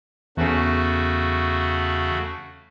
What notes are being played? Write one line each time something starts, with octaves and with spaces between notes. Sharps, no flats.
E2 C#3 A3 C#4 F#4